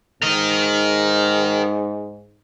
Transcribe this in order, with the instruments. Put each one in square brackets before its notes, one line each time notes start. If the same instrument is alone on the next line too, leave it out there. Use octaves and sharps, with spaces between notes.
[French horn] G#2 [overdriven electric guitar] A#4 D#5